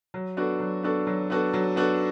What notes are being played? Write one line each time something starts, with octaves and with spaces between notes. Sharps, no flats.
F#3
B3 D4 F#4 A4
F#3
B3 D4 F#4 A4
F#3
B3 D4 F#4 A4
F#3
B3 D4 F#4 A4